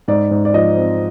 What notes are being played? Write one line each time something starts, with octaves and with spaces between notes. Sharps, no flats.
G#2 D5
G#2
D5
F3 D#5
C4